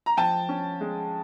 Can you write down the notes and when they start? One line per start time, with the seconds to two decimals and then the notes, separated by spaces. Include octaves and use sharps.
0.06 A#5
0.17 F3 G5 A5
0.49 C#4
0.81 G#3